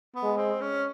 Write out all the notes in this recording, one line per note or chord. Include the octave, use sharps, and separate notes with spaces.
B3
G#3
C4
C#4